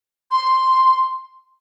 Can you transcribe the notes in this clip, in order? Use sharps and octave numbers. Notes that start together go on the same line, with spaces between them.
C6